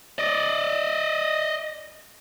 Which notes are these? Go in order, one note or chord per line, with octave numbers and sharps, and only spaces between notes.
D5 D#5